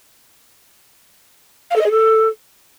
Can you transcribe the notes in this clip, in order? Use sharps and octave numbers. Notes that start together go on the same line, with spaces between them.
F5
A4
D#5
G#4
A4